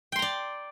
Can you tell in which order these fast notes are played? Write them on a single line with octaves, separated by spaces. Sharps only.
G5 C6 A#5 D5